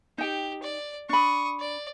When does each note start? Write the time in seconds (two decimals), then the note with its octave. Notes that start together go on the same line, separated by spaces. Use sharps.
0.18 D#4 G4 G5
0.63 D5
1.09 D4 B5 C#6 D#6
1.60 D5